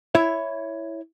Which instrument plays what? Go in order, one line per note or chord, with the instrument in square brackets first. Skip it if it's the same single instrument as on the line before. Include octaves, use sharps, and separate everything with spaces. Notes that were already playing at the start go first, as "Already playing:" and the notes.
[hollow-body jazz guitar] E4 C#5 E5